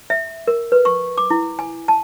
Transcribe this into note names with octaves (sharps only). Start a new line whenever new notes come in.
E5
A#4
B4
C#6
D6
E4
G#5
A5